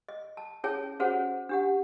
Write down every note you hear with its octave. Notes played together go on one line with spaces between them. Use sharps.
D#5
A5
C#4 E4 G#4 C#5 G5 A5
C#4 F#4 G#4 C5 C#5 F#5
D4 G4 F#5